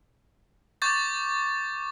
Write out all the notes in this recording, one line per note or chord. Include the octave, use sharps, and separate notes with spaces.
C#6 D6 G6 A6